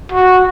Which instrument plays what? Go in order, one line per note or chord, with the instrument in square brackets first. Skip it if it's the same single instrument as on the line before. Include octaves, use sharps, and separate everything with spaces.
[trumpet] F#4